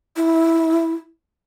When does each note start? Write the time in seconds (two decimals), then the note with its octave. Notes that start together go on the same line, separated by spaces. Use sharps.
0.17 E4